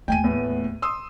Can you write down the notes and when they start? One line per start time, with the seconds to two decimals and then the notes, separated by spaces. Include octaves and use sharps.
0.08 D#2 A3 G5 G#5 D#7
0.23 E2 A2 B3
0.82 C6 D#6 E6